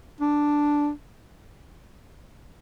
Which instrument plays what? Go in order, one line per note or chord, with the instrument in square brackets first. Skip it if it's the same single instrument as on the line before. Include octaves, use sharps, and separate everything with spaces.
[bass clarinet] D4